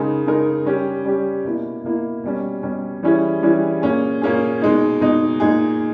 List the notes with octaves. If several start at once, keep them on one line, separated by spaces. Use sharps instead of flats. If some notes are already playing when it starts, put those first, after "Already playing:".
Already playing: C#3 G#3 D#4 A#4
C#3 G#3 D#4 A#4
G3 C#4 G4
G3 C#4 G4
B2 A#3 E4
B2 A#3 E4
B2 G3 C#4
B2 G3 C#4
E3 G3 C#4 E4 G#4
E3 G3 C#4 E4 G#4
A#2 A#3 C#4 G#4
A#2 A#3 C#4 G#4
B2 G#3 D#4
B2 G#3 D#4
A#2 G#3 D#4 G#4